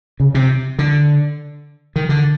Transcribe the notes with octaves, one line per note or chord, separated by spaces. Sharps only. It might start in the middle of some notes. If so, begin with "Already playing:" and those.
C#3
C3
D3
D#3
D3